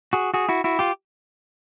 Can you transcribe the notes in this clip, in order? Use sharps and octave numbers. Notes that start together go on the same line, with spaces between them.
F#4 G#4
F#4 G#4
E4 F#4
E4 F#4
F4 G4